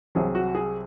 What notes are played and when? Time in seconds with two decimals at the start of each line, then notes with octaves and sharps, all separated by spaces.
0.15 C2 C3 F#3 G#4
0.35 F#4
0.55 G#4